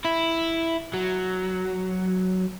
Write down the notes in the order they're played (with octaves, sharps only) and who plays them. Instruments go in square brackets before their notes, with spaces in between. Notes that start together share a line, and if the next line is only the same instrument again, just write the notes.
[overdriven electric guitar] E4
F#3